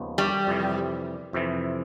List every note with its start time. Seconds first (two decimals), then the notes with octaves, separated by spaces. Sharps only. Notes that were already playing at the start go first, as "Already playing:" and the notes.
Already playing: D#2 C#3 F3 G#3 B3
0.18 G3
0.47 F2 C3 E3
1.33 F2 C3 E3